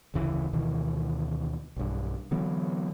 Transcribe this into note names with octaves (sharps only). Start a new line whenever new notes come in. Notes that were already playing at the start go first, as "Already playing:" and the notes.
F1 D2 C#3 E3
D2 B2 D#3 E3
B1 G2
D3 E3 F#3 B3